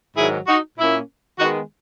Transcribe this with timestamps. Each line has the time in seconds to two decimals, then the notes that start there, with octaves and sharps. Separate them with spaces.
0.17 G#2 D#3 F#3 E4 G#4
0.47 D#4 F#4
0.78 A#2 A#3 C#4 E4
1.39 D#3 G#3 B3 D#4 F#4